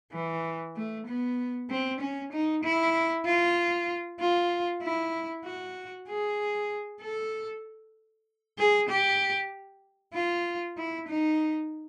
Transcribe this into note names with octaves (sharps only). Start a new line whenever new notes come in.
E3
A3
B3
C4
C#4
D#4
E4
F4
F4
E4
F#4
G#4
A4
G#4
G4
F4
E4
D#4